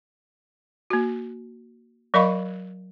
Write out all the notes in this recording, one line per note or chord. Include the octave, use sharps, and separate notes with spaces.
A#3 F#4
F#3 A#4 D#5 F5 B5 C#6